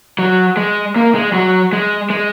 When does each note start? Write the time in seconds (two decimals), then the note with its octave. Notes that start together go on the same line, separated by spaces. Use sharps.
0.19 F#3
0.57 G#3
0.96 A#3
1.15 G#3
1.34 F#3
1.73 G#3
2.10 G#3